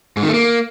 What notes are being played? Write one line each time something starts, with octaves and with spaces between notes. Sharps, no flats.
G#2
D#3
A3
A#3